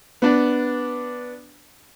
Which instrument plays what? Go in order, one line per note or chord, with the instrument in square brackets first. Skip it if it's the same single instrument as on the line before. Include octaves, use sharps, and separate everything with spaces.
[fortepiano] B3 D4